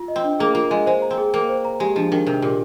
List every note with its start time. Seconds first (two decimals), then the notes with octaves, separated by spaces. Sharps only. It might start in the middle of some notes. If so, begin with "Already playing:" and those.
Already playing: F4
0.08 D#5
0.16 C4
0.24 D4
0.40 A#3 G#4
0.55 A#3 F4
0.71 G#3 D#5
0.86 G#3 C5
1.02 A#5
1.11 C4
1.18 G#4
1.33 A#3 G5
1.49 C5
1.65 A#5
1.80 G#3 G4
1.96 F3 D4
2.12 D#3 D4
2.27 C3 A#4
2.42 A#2 G4